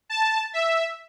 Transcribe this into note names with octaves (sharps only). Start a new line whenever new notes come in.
A5
E5